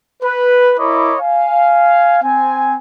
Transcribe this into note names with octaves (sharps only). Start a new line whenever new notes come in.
B4
E4 A#4 C#5 D#5 B5 D6
F5 G#5
C4 G#5